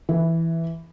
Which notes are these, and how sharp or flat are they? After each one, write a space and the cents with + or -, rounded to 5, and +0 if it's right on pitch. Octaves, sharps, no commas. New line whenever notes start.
E3 +0